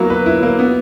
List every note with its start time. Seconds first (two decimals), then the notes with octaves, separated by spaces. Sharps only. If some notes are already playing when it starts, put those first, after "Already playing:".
Already playing: F#3 A#3 B3 E4
0.10 B4
0.26 E4
0.43 A#3
0.59 B3